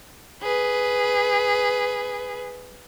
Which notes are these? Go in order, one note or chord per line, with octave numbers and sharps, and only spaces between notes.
G#4 B4